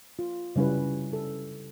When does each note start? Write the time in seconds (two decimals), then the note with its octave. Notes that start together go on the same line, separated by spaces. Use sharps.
0.19 F4
0.56 C#3 G3 C#4 E4 B4
1.13 A4